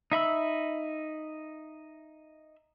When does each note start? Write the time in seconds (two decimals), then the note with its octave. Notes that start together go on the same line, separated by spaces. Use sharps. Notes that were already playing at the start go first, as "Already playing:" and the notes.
0.12 D#4 E5 B5 E6